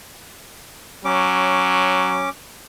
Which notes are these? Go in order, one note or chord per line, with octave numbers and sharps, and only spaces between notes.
F#3 C#4 D6